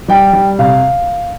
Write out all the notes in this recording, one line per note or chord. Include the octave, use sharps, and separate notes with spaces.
G3 G5
G3
C3 F5